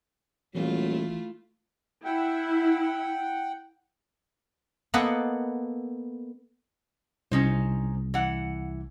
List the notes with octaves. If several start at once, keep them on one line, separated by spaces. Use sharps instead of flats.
D#1 E3 F#3 A3 E4 F4
E4 F#5 G5
A#3 B3 A4 B4 D#5 F#5
C2 C#4 D#4 C5
E3 F#5